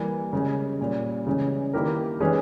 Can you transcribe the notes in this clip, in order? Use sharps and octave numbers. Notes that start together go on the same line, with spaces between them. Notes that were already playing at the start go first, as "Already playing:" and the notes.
Already playing: E3 G3 A#3
C#3 G#3 C#4
A#2 G3 C#4
C#3 E3 G#3 C#4
D#3 A#3 E4 G4 A#4
E3 G#3 C#4 G#4 B4